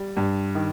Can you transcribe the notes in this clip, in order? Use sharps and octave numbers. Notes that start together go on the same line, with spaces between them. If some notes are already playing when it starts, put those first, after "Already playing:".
Already playing: G3
G2
D#3